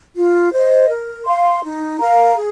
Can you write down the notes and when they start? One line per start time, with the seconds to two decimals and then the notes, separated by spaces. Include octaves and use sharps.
0.15 F4
0.53 C5 D#5
0.89 A#4
1.25 F5 C6
1.63 D#4
1.99 A#4 F5 A#5
2.36 G#4